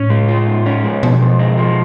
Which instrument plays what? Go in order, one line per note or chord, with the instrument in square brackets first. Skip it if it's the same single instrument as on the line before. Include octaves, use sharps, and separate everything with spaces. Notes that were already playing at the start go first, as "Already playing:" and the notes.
Already playing: [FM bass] A2 [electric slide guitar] C#4
[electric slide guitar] G#3
F4
G#2
C#4
G#3
[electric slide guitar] F2 [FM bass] B2
[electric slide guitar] F2
G#3
F3